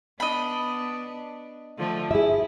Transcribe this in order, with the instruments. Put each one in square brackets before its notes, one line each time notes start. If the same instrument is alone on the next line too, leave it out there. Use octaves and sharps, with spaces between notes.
[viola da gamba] B3 D4 [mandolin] D#5 B5
[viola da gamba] D3 F3 A3
[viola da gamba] E4 [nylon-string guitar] G#4 E5